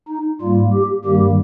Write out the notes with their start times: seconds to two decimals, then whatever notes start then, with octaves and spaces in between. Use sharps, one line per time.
0.09 D#4
0.41 G#2 G3 A#3 F4
0.73 G4
1.05 G2 D#3 G3 A#3 G4